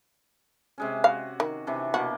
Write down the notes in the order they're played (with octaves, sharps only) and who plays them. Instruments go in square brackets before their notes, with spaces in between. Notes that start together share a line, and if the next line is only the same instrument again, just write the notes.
[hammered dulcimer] C3 G#3 C#4
[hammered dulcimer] F#4 [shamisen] F5
[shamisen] D#3
[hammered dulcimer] C3 E3 D4
[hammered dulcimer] B2 A#3 [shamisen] F#4